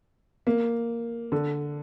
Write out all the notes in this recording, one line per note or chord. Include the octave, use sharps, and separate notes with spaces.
A#3
D3